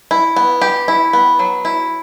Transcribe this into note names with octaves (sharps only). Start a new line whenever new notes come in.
E4
B3
G4
E4
B3
F#3
E4